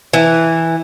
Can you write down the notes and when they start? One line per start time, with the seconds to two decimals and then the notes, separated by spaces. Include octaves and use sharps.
0.13 E3